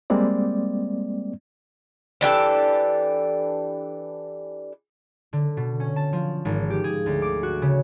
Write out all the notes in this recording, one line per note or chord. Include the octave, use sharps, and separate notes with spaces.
G3 G#3 A#3 C4 D5
E3 D4 G4 A4
D3
B2
C#4
A5
F3
G#1
G4
G#4
D2
D6
F#4
C#3